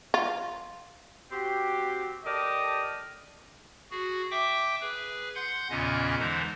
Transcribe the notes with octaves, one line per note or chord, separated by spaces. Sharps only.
F4
C4 F#4 G4
G4 A4 A#4 D5 D#5
F#4 G#4
E5 G5 D6
G#4 B4
F#5 C6 G6
E2 A#2 C#3 C#4 D#5 G6
D3 E3 G#3 D#4 C5